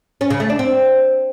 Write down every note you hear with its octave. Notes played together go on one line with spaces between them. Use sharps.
C#4
C#3
A3
D4
C4